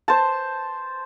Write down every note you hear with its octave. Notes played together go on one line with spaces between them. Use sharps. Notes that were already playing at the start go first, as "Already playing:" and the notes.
C5 A5